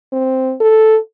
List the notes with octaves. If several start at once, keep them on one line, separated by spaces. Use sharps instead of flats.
C4
A4